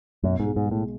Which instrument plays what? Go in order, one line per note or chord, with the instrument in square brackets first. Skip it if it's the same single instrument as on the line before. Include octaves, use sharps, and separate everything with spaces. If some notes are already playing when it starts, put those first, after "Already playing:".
[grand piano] B1 [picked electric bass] F#2
[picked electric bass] G#2
[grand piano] G#3
[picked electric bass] G#2
[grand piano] G#3
[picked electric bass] A2